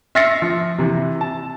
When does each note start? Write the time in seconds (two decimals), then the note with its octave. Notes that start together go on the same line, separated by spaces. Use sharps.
0.15 E5 F6 A6 A#6 C7 C#7
0.42 F3
0.78 C3 E3
1.21 A5